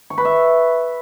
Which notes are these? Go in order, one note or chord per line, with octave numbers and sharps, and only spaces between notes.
C#6
B4
E5